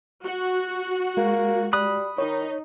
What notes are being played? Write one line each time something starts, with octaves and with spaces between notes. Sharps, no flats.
F#4
G#3 A#3
G3 B5 D#6 F#6
D#3 D#4 C#5